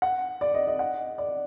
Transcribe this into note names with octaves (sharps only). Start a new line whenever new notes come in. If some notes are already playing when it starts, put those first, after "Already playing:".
F#5
D5
D#5
D#5
F#5
D5